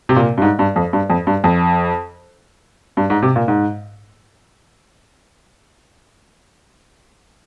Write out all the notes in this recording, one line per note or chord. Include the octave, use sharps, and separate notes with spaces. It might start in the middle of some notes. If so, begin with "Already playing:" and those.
C3
A#2
G2
G#2
G2
F2
G2
F2
G2
F2
G2
G#2
C3
A#2
G#2